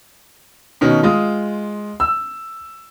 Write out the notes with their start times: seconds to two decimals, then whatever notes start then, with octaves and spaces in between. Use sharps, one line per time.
0.81 B2 D#3 C#4
1.03 G#3 F4 D#6
2.00 E6